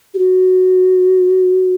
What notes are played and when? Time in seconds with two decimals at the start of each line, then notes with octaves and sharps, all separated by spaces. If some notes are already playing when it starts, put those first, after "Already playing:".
0.14 G4
0.18 F#4